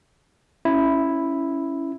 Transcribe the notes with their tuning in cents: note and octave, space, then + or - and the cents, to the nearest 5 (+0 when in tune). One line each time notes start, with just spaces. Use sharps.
C#4 +0 E4 +0